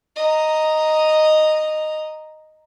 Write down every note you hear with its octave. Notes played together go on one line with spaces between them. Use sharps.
D#5 A#5